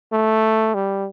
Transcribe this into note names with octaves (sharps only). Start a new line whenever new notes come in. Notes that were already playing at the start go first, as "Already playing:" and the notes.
A3
G3